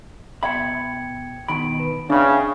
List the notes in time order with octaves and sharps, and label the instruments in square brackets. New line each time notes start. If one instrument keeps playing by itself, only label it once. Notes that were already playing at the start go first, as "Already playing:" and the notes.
[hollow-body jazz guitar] B2 E5 B5 [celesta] G5 G#6 C#7
[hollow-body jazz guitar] B2 D#3 B5 [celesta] D7
[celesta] B4
[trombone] C#3 [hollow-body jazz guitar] D4 B5 [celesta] E5 G5